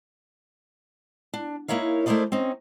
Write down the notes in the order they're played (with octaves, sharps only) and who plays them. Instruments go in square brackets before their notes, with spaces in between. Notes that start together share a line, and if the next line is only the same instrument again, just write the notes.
[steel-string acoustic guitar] D4
A#3 D#4 E4 A#4 C#5 F5
A3 E4 A#4 C5 D5 D#5
C4 C#4 D#4